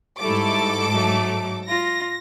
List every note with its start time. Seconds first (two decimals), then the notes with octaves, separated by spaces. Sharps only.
0.20 G#2 G3 A3 E4 A4 D6
0.90 F#3 A3
1.68 F4 A#6